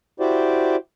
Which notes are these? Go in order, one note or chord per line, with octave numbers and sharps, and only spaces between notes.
E4 F#4 G4 C5 D5